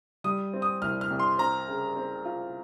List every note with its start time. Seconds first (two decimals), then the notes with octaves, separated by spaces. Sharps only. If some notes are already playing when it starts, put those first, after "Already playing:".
0.24 G3 D#6
0.54 C4
0.62 D#6
0.82 C2 F6
1.01 F6
1.11 C2
1.19 C6
1.38 C4 A#5
1.68 C#3
1.96 C4
2.25 F4